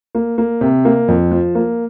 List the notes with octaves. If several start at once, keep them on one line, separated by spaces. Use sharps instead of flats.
A#3
A#3
C3
A#3
F2
F3
A#3